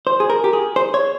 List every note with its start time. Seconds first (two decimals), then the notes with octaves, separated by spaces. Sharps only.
0.07 C5
0.20 G#4
0.30 A#4
0.44 G4
0.53 G#4
0.76 C5
0.94 C#5